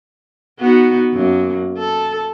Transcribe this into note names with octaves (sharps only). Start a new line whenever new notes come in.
B3 D#4 F#4
F#2 A#3
A4